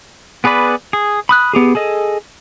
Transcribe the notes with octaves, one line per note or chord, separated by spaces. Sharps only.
B3 G#4 B4 D5 B5
G#4
B5 D#6 F#6
B3 G4 G#4
G#4 A4 D#5